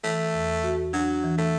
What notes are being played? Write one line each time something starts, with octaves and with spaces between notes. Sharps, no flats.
E3 A3
E2
F#4
F#3 D4
E3
A3